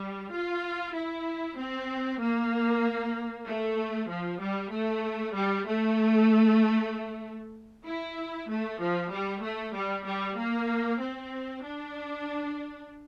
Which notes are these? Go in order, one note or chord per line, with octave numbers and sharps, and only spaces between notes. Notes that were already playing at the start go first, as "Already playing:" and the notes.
Already playing: G3
F4
E4
C4
A#3
A3
F3
G3
A3
G3
A3
E4
A3
F3
G3
A3
G3
G3
A#3
C4
D4